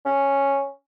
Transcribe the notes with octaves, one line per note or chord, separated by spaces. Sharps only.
C#4